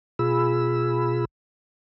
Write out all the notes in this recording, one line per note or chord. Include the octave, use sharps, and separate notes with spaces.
B2 F4 G#4 B5 E6